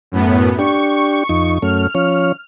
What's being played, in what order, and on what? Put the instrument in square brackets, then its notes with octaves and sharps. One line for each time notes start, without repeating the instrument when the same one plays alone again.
[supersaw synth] F#2 A2 B3
[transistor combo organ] D4 G4 [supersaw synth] C#6
[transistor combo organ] F2 D#4
[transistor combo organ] F#2 A3 C#4 [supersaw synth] F6
[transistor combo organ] F3 C#4 C#5